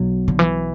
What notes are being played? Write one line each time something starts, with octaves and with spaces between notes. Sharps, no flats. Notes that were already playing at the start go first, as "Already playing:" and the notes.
Already playing: B1 B2 F#3
D3
E3